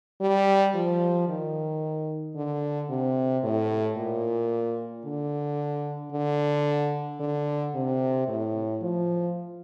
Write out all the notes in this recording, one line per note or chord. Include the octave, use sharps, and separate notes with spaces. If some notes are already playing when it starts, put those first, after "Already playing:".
G3
F3
D#3
D3
C3
A2
A#2
D3
D3
D3
C3
A2
F3